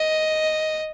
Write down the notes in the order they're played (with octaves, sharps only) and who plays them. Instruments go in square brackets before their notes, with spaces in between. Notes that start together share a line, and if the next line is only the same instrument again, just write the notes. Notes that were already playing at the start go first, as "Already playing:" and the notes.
Already playing: [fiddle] D#5